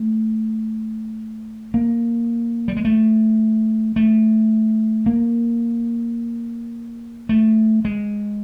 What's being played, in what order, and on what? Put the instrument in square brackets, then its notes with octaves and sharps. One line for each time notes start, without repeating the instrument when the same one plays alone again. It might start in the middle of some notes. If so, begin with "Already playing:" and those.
Already playing: [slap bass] A3
A#3
G3
G#3
A3
A3
A#3
A3
G#3